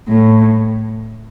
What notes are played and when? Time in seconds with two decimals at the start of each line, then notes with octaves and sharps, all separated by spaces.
0.08 A2